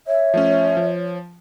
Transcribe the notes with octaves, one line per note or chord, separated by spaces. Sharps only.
C#5 E5
F3 A3 C#4
F3